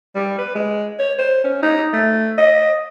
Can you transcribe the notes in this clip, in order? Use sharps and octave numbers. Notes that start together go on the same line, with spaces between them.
G3
B4
G#3
C#5
C5
C#4
D#4
A3
D#5